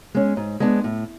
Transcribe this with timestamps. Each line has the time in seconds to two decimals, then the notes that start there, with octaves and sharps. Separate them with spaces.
0.15 G#3 C#4
0.37 G#2
0.60 G#3 B3 D4
0.84 A2